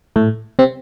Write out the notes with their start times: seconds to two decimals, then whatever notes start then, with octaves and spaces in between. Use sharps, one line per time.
0.16 A2 A3
0.59 C3 C4